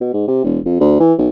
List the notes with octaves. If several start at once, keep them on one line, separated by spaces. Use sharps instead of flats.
B2
G#2
C3
E1
F2
D2
E3
B1